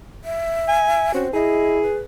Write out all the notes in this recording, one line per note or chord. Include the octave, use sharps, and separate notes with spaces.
E5
G#5
C4 C#4 F#4
E4 G#4 D#5
B4